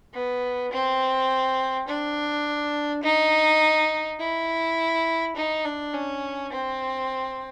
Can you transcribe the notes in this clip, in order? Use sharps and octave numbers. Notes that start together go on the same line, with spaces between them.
B3
C4
D4
D#4
E4
D#4
D4
C#4
C4